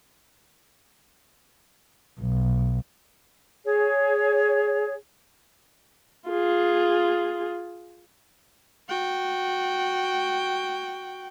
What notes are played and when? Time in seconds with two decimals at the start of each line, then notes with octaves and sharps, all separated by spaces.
2.21 B1
3.65 G#4 C#5
6.29 F4 G#4
8.88 F#4 G5